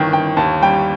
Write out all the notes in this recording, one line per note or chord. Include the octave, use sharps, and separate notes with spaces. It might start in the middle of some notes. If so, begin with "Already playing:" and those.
Already playing: G1 D#3 G5
G1 G5
D#2 A5
G3 G5